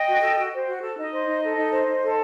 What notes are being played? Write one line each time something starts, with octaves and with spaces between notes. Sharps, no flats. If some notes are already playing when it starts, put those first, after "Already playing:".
Already playing: D#5 G5
F#4
A4
F#4
C5
F#4
A4
D#4 D#5
C5
D#4
A4
D#4
C5
D#4
A4